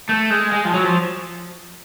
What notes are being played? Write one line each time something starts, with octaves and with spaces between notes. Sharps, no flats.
A3
G#3
G#3
F3
F#3
F3